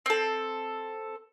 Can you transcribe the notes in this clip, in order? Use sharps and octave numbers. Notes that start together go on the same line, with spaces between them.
C4 A4